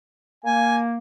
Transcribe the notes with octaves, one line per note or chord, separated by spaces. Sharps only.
A#3 G#5